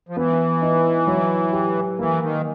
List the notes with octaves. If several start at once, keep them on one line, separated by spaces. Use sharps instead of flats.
F3
E3 B3
D#4
F#3
G4
E3 A#3
D#3